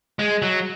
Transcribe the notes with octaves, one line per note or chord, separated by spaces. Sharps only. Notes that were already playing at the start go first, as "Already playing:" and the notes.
G#3
F#3